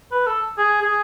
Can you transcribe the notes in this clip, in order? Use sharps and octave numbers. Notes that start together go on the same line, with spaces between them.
B4
A4
G#4
G#4